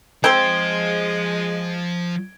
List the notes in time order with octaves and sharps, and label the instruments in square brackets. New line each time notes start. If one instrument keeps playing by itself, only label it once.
[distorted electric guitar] F3 [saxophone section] G#3 [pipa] C4 C5 [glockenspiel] G#6 D7 G7